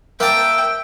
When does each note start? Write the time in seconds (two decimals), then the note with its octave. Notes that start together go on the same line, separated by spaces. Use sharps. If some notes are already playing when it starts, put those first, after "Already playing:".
0.20 A#3 E5 G5 A5